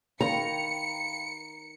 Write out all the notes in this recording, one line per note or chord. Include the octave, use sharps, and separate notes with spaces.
D#3 F5 G5 A#5 B5 C#7